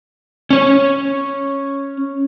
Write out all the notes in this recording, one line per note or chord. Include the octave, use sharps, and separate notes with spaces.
C#4 C#5